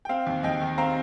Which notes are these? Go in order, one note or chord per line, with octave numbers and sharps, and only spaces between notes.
G5
C4 F5
D#2
D#2 D#5 G5
D#3
C4 F5 A#5